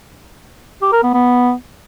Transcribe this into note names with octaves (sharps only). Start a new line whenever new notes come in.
G4
A#4
B3
B3